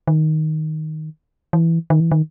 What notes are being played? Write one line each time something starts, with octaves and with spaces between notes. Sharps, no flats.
D#3
E3
D#3
E3
D#3